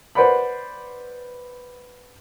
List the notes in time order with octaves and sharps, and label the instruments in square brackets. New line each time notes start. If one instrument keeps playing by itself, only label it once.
[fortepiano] B4 C5 D5 F#5 B5